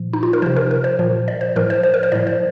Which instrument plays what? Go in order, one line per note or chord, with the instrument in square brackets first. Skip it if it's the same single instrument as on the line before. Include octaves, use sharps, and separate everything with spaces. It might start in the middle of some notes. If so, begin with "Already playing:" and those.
Already playing: [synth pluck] A#2 F3
D#4
F4
A#4
C3 F3 C5
A#4
A#4
C5
A#2 F3
D5
C5
A2 F3 A#4
C5
C5
A#4
C5
A2 F3 D5
C5